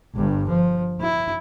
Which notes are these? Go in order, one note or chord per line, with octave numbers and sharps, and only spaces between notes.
G1 G2
F3
E4